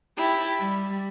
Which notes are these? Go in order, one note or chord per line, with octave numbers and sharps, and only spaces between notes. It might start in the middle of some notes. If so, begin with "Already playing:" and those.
E4 G4 A5
G3